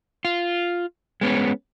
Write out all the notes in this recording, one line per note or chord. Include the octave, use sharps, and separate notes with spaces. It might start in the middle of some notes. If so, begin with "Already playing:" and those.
F4
G#3 B3 C#4